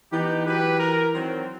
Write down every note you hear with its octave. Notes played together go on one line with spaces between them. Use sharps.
E3 B3 D#4 G4
F#3 G4 B4
A#4
D#3 F#3 C4